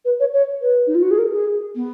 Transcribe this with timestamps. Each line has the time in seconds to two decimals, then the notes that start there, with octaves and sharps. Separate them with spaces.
0.05 B4
0.20 C#5
0.34 C#5
0.61 B4
0.87 D#4
0.95 F4
1.02 F#4
1.11 G#4
1.18 A#4
1.32 G#4
1.76 B3